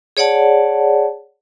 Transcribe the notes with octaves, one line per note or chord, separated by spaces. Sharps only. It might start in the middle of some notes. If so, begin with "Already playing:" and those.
G#4 C#5 D5 F#5 A5